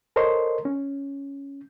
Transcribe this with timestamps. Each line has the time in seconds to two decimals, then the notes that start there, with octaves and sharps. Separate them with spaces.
0.16 A4 A#4 C5 C#5 D#5 C6
0.65 C#4